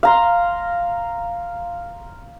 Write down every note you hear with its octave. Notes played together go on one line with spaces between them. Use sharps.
F5 A#5 C6